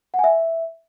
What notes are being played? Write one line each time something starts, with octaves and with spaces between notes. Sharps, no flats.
F#5
G#5
E5